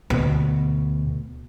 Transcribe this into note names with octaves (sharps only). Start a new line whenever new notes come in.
D2 B2